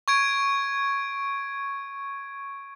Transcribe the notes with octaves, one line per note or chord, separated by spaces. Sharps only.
C#6 G#6 D7